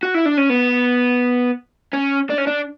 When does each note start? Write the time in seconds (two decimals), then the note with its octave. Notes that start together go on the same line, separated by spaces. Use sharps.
0.03 F#4
0.15 E4
0.26 D4
0.38 C#4
0.50 B3
1.94 C#4
2.30 D4
2.38 C#4
2.47 D4